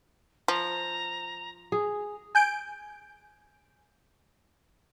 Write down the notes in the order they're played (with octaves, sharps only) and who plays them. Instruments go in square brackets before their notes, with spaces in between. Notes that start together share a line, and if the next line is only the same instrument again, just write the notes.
[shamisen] F3 [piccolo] A#5
[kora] G#4
[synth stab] G#5 G6 D7